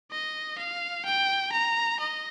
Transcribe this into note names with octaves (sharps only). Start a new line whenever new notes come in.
D#5
F5
G5
A#5
D#5